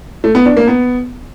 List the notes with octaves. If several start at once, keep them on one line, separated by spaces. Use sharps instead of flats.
A3
B3
D4
A#3
B3